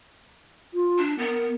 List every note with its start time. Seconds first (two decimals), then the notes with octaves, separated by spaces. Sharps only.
0.74 F4
0.98 D4
1.18 B3 A#4